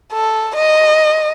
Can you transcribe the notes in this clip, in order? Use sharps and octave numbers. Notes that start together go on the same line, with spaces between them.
A4
D#5